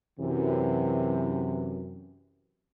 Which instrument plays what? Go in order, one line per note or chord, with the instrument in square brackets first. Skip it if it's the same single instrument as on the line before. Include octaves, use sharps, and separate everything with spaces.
[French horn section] F#2 C3 E3